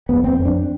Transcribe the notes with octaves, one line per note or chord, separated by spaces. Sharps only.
F2 B3
F2 C4
F2
D4